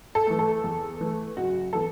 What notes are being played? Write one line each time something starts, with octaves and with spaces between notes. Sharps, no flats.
A4
E3 A3
A4
E2
E3 A3
F#1 F#4
E3 B3 A4